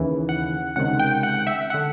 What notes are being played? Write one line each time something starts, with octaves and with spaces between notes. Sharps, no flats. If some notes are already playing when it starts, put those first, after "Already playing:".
Already playing: D#2 C#3 E3
F#5
C#2 C3 D#3 F#5
G5
F#5
E5
D3 F#5